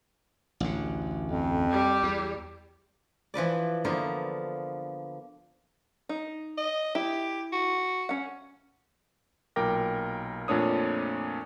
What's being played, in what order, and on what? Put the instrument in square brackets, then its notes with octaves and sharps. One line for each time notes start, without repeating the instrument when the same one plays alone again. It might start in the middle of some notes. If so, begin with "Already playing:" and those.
[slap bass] A1 D2 D3
[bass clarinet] F2
[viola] G3 G4
[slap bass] E2
[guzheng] E3 F3 B4 D5
D3 F3 A#3 B3 F4
[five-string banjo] D#4
[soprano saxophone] D#5
[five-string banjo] E4 [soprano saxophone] G4
[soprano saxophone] F#4
[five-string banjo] C#4 F#5
[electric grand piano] B1 A#2 A#4 G5 D6 A#6
F2 A#2 A3 D4 C#5 D#6